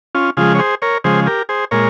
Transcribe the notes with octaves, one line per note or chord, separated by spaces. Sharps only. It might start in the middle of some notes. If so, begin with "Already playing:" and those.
C#4 F4
C#3 F3 G#3 F4 G#4
C#5
G#4 C5
A#4 C#5
C#3 F3 G#3 G#4 C5
G4 A#4
G#4 C5
A#2 G#3 A#4 C#5